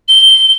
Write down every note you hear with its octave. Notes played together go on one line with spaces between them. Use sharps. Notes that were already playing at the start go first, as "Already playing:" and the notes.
G7